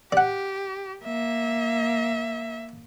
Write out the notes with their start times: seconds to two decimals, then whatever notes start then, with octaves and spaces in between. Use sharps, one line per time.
0.12 G4 D5 F#5
1.04 A#3 E5